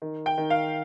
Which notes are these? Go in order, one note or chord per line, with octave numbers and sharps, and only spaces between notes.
D#3
G5
D#3
F5